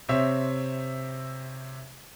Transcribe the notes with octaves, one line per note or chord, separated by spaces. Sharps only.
C3 C4 C#5 E5